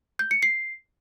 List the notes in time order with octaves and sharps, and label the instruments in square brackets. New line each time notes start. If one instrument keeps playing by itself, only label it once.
[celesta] G6
C#7
C7